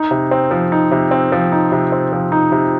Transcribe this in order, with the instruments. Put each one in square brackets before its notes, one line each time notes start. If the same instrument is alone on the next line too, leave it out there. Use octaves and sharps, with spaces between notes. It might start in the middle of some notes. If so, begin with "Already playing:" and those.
Already playing: [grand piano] D#4
C3
C4
F3
D#4
C3
C4
F3
D#4
C3
C4
F3
D#4
C3